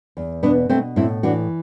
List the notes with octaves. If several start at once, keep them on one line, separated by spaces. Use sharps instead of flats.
E2
B2 B3 D4
B2 A3 C4
A2 C4 E4
E3 D4 F#4